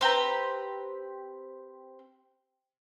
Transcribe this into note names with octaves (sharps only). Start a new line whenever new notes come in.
C4 G4 B4 A#5